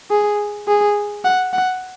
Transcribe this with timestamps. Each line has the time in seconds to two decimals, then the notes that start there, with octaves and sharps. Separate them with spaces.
0.11 G#4
0.68 G#4
1.25 F#5
1.53 F#5